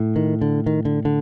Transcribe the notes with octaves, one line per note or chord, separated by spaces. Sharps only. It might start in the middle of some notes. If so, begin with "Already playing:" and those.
Already playing: A2
D#3
D3
D#3
D3
D3